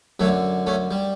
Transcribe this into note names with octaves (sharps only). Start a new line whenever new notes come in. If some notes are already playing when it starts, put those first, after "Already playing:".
F#2 D3 F#3 A3
A3 C#4
G3